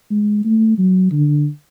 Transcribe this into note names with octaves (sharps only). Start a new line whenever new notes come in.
G#3
A3
F#3
D3